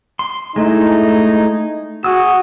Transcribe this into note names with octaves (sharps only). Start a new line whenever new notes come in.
C6
G#3 A3 D#4 E4
F#4 G#4 E6